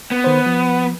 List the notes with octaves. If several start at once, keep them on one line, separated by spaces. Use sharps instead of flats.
B3
D#3 C5
F3